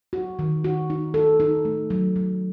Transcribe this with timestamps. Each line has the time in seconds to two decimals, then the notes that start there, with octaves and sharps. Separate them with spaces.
0.13 F#4
0.39 D#3
0.64 F#4
0.90 D#4
1.14 A4
1.40 D#4
1.65 A3
1.90 F#3
2.16 F#3